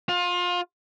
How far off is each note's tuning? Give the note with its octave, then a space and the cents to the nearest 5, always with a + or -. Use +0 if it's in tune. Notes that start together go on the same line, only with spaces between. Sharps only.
F4 +25